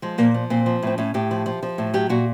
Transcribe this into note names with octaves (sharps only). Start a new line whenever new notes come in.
F3 G#3
A#2 A#3
F3
A#2 C4
F3
A2 C4
A2 C#4
A2 G4
F3
F3
F3
A2
F#3 G4
A#2 F#4